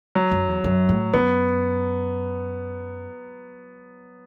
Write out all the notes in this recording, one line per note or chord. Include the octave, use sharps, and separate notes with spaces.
F#3
F#2
E2
F#2
A2
F#2 B3